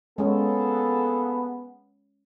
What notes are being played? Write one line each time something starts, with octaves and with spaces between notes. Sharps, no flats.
G#3 A#3 B3 C#4 G#4 A4